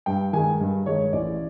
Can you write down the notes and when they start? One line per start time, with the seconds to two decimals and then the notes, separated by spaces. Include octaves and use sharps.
0.06 G2 G5
0.33 D#3 G#3 G#5
0.60 G2
0.86 D#3 G#3 C#5
1.13 A1 D5